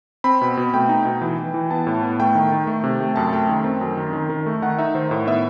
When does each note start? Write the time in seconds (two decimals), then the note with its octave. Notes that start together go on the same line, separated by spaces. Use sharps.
0.24 C4 B5
0.41 B2
0.57 B2
0.74 A3 G5
0.89 D#4
1.05 B2
1.21 E3
1.39 E3
1.54 E3
1.71 B3 A5
1.87 A2
2.03 B3
2.20 A3 G5
2.35 D#3
2.52 D#3
2.67 A3
2.84 C3
3.00 A3
3.16 F#2 A5
3.33 A3 G5
3.49 D#3
3.64 C4
3.81 F#2
3.97 D#3
4.13 D#3
4.30 D#3
4.46 A3
4.62 D#3 F#5
4.79 D#4 E5
4.95 D#3 C5
5.11 A2
5.27 B3 E5